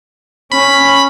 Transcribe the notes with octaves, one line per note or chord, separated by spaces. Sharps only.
C#4 B5